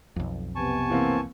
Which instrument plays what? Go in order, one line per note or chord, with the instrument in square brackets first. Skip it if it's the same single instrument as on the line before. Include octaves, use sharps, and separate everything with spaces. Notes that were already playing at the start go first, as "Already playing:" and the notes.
[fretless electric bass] B1 F2
[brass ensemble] C3 B3 [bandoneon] G#5 A5 C#6
[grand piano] E3 A#3 C4